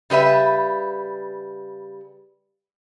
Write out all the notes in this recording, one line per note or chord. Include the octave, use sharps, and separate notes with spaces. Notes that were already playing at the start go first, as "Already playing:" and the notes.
C#3 G3 B4 E5